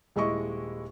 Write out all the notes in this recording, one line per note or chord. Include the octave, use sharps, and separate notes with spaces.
D#1 G#3 E4 D#5 C#6